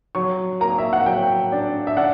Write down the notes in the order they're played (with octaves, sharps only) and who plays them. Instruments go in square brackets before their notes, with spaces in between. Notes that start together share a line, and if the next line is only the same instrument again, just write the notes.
[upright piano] F#3 C#6
A#3 A#5
E5
F#5
F#3 G5
D4
E5
D4 F#5